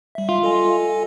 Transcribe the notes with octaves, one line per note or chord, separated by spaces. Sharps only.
G3 E5
F4
A4 D#5 G#5